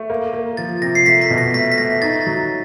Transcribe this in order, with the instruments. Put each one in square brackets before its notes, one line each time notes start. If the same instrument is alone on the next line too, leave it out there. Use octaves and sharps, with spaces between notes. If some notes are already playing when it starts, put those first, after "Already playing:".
Already playing: [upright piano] A3
A#3
A#3
[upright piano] F3 [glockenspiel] A6
[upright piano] C3 [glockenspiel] A#6
[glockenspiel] C7
[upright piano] A3 [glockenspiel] B6
[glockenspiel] B6
[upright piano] B2
[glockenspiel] A#6
[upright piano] A3 [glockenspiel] B6
[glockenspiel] B6
[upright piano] A3 [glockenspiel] A#6
[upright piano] D#4 [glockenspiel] A6
[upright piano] F#3